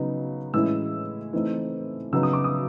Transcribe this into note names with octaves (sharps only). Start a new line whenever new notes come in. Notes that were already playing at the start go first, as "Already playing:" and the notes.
Already playing: C#3 F#3 B3 D#4
A2 E3 G#3 C#4 E4 E6
E3 A3 C4 D#4
C#3 F#3 B3 D#4 E6
D#6
D6
D#6